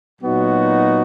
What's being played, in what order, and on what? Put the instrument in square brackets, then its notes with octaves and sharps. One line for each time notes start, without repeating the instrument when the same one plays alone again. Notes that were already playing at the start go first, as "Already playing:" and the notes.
[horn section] A#2 F#3 B3 D#4 F#4